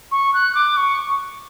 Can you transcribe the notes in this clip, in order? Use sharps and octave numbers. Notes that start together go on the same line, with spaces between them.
C#6
F#6
D6
C#6